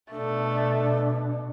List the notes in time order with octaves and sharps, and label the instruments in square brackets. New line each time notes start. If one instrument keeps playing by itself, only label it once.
[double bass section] B2 [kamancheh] A3 [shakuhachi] D4